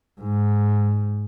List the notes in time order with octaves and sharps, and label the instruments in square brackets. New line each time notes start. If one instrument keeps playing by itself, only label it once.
[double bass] G#2